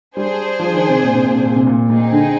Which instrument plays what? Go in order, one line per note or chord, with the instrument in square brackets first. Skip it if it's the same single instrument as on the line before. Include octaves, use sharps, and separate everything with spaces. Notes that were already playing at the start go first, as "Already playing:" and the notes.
[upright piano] G3 [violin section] D4 G#4 C5
[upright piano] F3
D#3
C3
A#2
C3
A#2
C3
A#2
C3
A#2
[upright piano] A#2 [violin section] C4 D#4 G#4
[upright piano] D3